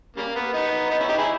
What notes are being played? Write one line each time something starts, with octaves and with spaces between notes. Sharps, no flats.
C#3 G3 A#3
B3
B3 D#4
B3 D#4
C#4 E4
D#4 G4
E4 G#4